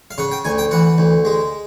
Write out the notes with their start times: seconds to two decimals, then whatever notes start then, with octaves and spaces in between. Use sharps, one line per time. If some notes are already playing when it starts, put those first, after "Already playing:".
0.11 F5
0.18 C#3 F#5
0.31 G5
0.45 D2 G#5
0.58 G5
0.71 E3 F#5
0.98 D2
1.25 G#3